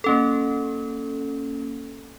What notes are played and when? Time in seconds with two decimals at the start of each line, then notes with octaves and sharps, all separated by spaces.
0.04 A#3 C#4 A4